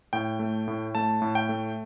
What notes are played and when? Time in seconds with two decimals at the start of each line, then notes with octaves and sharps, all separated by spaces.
0.13 A2 G5
0.39 A3
0.68 A2
0.95 A3 A5
1.22 A2
1.35 G5
1.49 A3